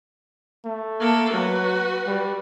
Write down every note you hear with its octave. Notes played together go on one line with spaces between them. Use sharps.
A3
A#3 A4
F#3 F#4 B4
G3